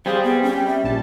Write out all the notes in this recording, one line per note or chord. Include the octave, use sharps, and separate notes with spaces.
G3 C4 G#4 C5 F5
B3
C#4 G5
E5
A#1 A5